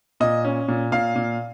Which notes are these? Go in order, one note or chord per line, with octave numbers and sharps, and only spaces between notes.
A#2 D#5
C#4
A#2
A#2 F5
A#2